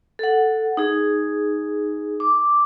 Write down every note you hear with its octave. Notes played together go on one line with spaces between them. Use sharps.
A4 F#5
D#4 G#4
D6